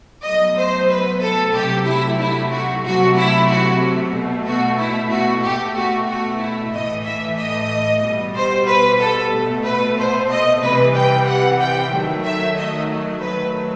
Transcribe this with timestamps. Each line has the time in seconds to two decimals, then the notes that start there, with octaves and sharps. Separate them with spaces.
0.25 B2 F#3 A3 D#5
0.58 C5
0.90 B4
1.22 A4
1.55 C3 F#3 A3 G4
1.87 E4
2.19 E4
2.51 F#4
2.85 C3 F#3 A3 F#4
3.17 E4
3.49 F#4
4.14 B2 A3
4.47 F#4
4.79 E4
5.11 F#4
5.44 B2 A3 G4
5.77 F#4
6.09 F#4
6.41 E4
6.73 A2 E3 A3 D#5
7.06 E5
7.38 D#5
8.04 B2 G3
8.35 C5
8.67 B4
9.00 A4
9.33 B2 A3
9.65 B4
9.98 C5
10.30 D#5
10.62 C3 E3 G3 B4
10.95 G5
11.27 F#5
11.60 G5
11.92 D#3 F#3 A3
12.25 E5
12.57 D#5
13.21 D#3 F#3 A3 B4